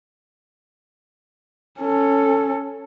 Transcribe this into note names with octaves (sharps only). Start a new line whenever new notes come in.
C#4 A4